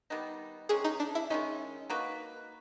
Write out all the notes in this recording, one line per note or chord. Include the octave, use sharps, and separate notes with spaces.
D#3 G3 B3 D#4
C3 E3 G#3 C#4 G#4
D#4
D4
E4
D#3 G#3 C#4 D#4
A#3 D#4 F#4 B4